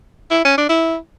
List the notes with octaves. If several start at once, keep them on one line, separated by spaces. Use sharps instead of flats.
E4
C#4
D4
E4